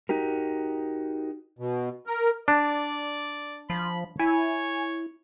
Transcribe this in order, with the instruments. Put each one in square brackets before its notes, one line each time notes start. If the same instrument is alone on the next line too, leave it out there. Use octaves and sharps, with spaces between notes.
[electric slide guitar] D#4 F#4 G4 A#4
[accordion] B2
A#4
[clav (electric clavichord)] D4 [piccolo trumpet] D5
[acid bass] F3 [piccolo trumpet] B5
[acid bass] E4 [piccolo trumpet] C#5 [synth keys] G#5